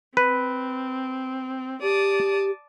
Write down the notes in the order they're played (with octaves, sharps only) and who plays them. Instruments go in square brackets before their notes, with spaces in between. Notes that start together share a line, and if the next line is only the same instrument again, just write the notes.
[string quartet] C4 [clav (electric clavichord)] B4
[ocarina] G4 [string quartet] D5 A5 D#6